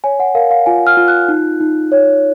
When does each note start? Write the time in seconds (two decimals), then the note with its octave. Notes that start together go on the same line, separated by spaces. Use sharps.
0.04 C#5 G#5
0.20 F#5
0.35 A#4 F5
0.51 F5
0.66 F4 G#5
0.87 F6
0.97 F4
1.08 F#6
1.28 D#4
1.60 D#4
1.92 C#5